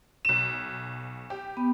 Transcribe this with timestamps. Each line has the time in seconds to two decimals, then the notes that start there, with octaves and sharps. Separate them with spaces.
0.25 B1 E7
1.30 G4
1.57 B3